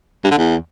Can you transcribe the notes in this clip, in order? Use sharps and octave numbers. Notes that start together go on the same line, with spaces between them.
G2
D3
E2